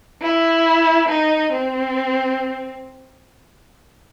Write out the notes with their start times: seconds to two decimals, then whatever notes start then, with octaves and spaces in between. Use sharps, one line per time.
0.22 E4
1.09 D#4
1.53 C4